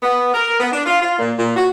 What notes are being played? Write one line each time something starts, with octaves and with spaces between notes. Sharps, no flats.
B3
A#4
B3
D4
F4
F4
A#2
A#2
F#4